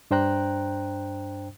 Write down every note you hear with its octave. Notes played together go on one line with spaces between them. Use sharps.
G2 D4 C5 G5 A#5 F#6